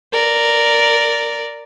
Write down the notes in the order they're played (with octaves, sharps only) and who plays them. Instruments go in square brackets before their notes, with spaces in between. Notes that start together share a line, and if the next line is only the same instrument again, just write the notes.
[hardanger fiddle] A#4 D5